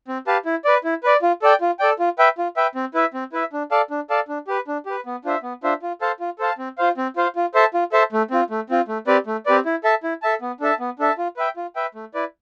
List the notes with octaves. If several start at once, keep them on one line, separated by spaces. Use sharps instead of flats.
C4
G4 B4 F5 A5
E4
B4 D5
E4
B4 D5
F4
A4 D5 G5
F4
A4 D5 G5
F4
B4 E5 G5
F4
B4 E5 G5
C4
E4 B4 E5
C4
E4 B4 E5
D4
A4 D5 F5 A5
D4
A4 D5 F5 A5
D4
G4 B4
D4
G4 B4
B3
D4 F4 C5 E5
B3
D4 F4 C5 E5
F4
A4 C5 F5 A5
F4
A4 C5 F5 A5
C4
F4 C5 F5
C4
F4 C5 F5
F4
A4 C5 E5 A5
F4
A4 C5 E5 A5
A3
C4 F4
A3
C4 F4
A3
C4 G4 B4 D5
A3
C4 G4 B4 D5
E4
A4 E5 A5
E4
A4 E5 A5
B3
D4 A4 E5 A5
B3
D4 A4 E5 A5
F4
B4 E5 G5
F4
B4 E5 G5
A3
E4 B4 D5